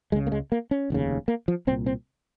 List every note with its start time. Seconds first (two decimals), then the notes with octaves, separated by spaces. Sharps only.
0.12 C#2 C#3 G#3
0.26 A#3
0.32 G#3
0.52 A#3
0.71 C#4
0.90 F1 D#2 C#3
1.28 A#3
1.48 F3
1.67 C2 C4
1.71 A#2
1.86 C4